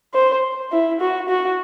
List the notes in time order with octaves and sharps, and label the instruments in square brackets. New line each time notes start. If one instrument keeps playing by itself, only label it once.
[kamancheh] C5
E4
F#4
F#4